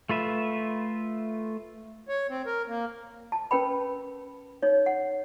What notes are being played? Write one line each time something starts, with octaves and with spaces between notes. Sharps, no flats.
A3 F4 B4 E5
C#5
C4
A#4
A#3
A5
C#4 A#4 B4 G5 B5
D#4 C#5
F#5